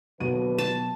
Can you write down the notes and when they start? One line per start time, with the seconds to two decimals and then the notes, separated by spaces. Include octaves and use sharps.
0.20 D#2 B2 D3 F#3 F#4 B4 D#7
0.58 A5